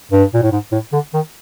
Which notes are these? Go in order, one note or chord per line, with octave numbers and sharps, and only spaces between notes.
G2
A#2
A2
G#2
A2
D3
D#3